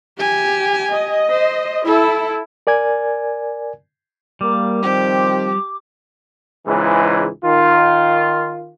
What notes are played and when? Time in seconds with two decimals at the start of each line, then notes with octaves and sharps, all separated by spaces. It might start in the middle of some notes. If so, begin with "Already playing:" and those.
0.19 G4 G#5
0.92 D#5
1.31 C5
1.86 E4 A4
2.67 A#4 D5 G#5 G#6
4.41 G3 A#3 D6
4.83 D#3 F3 C4 G4
6.65 C#2 G#2 E3
7.43 D#3 F4